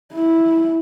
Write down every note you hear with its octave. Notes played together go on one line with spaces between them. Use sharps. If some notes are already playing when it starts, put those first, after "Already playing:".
E4